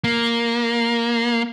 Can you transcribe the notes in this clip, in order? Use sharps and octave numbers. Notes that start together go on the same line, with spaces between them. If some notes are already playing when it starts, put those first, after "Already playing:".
A#3